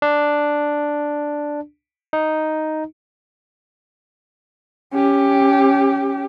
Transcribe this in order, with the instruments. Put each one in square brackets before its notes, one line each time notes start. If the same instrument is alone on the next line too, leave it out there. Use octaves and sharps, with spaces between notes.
[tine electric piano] D4
D#4
[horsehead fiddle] C#4 G4